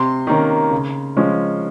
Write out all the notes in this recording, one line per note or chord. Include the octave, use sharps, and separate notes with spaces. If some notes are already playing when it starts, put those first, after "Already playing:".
Already playing: C3 C6
D#3 A#3 C#4
C#3
F3 G#3 C#4